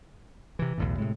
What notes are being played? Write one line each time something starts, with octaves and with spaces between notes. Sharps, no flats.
C3 E3
B1 E2 A2
A2 C3 G#3